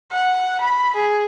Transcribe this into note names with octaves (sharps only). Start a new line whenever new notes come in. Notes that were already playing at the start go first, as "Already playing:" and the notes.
F#5
B5
G#4